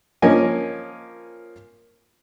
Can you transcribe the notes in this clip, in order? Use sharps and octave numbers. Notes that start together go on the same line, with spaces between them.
F3 A#3 C#4 D#5 G#5